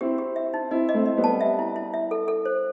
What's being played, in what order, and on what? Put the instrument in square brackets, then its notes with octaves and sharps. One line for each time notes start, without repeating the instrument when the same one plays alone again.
[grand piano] C4 E4 [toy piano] G4
[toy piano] G4
E5
D#4
[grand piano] C4 E4 [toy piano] D#5
[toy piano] D#5
[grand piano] A3 C4
[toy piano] D#5
[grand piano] G3 B3
[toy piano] A5
E5
E4
E4
E5
A4
A4
C5